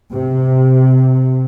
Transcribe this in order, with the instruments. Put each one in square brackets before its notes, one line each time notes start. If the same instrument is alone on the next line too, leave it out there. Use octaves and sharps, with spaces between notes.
[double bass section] C3